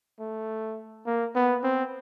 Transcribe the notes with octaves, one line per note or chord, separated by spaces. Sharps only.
A3
A#3
B3
C4